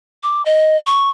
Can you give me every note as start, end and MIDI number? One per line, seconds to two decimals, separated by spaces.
0.23 0.44 86
0.45 0.77 75
0.87 1.10 85